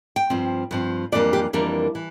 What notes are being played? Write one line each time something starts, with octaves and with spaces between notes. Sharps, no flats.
G5
G2 F3 C4
G2 F3 C4
F2 E3 G3 A#3 D4 D5
G4
F2 E3 G3 A#3 D4 A#4
E3